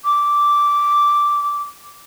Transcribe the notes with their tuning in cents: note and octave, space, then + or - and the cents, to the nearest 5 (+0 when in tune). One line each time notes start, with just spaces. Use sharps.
D6 -5